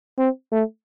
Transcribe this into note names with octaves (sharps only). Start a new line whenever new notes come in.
C4
A3